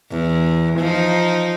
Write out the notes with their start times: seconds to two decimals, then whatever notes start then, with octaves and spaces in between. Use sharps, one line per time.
0.11 E2
0.79 F3 D#4